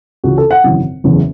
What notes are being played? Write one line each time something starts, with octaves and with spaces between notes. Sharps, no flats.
C#2 C#3 E3 F#4
A4
F#5
G#1 F#2 C#3 E3
F#1 E2 C#3 E3